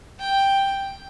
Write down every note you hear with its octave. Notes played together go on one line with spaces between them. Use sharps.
G5